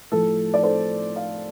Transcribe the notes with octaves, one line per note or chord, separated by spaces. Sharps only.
A2 F3 A4
D5
A4 C5
D5 F5